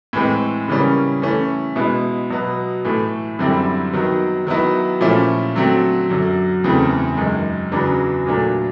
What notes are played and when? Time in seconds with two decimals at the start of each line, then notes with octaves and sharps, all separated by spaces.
0.13 A2 E3 G#3 C4
0.68 C#3 E3 G3 A#3 C#4
1.22 E3 A3 C#4
1.76 B2 G#3 B3 E4
2.30 B2 F#3 B3
2.85 A2 E3 A3
3.39 F#2 D3 G3 C4 E4
3.93 D#3 F#3 B3
4.47 D#3 F#3 B3 E4
5.01 A#2 F3 A3 C#4 E4
5.55 D3 F#3 A3 C4
6.10 F#2 D3 F#3
6.64 E2 C#3 E3 A3 C4
7.17 F#2 D#3 G#3
7.72 E2 C#3 F#3 B3 D4
8.26 A#2 F#3 A3 D4